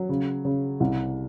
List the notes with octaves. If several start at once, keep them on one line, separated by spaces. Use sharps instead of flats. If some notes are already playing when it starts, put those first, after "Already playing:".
Already playing: F#3
C#3
C#3
C2